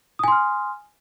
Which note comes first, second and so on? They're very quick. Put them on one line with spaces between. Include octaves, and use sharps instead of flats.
D#6 G#5 C6 F6